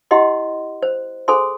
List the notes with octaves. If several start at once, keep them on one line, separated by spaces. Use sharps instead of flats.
E4 G4 D#5 F#5 C6
C5
G#4 A4 C5 G#5 C6